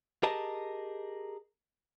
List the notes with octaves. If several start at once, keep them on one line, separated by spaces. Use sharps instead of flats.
G4 G#4 A#4 D#5 A5